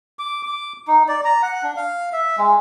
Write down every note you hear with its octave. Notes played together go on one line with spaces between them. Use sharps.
D6
D6
D#4
D5
A#5
F#5
D4
F5
E5
G#3